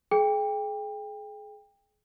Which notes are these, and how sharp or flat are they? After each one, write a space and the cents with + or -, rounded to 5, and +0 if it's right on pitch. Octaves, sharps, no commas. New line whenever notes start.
G#4 +35 G5 +25